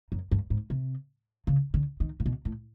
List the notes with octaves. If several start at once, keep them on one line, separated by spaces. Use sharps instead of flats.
F#2
G2
G#2
C3
C#3
D3
D#3
A#2
B2
A2